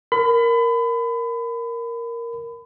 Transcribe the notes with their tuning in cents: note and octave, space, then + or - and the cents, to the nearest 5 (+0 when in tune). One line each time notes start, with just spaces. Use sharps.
A#4 +0 B5 +30